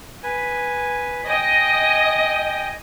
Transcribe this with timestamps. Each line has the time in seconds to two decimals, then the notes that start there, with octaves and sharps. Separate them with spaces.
0.23 B4 G#5
1.28 D#5 G5 G#5